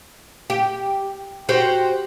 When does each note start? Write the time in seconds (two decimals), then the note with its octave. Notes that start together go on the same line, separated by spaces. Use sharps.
0.50 G4
1.49 F#4 G4 C5